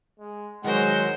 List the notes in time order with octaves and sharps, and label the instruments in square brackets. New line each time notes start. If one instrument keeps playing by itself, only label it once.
[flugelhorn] G#3
[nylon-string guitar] D#3 F#3 [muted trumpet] G#3 [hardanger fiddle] A#4 C5 [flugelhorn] F#5